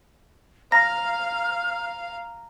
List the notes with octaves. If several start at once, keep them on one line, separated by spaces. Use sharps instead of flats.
F5 A#5 F6 A#6